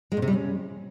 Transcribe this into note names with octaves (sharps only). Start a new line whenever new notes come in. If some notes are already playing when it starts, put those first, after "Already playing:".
G#3
A#2
C3
G3
C#4